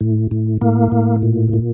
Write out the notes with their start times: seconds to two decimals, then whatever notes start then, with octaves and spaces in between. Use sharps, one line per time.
0.01 A2
0.31 A2
0.61 A2 A#3
0.92 A2
1.23 A#2
1.53 A#2